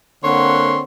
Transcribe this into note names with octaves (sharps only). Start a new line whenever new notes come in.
D3 A#3 C4 C#5 F#5 C6